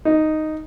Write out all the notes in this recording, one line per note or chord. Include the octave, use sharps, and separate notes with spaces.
D#4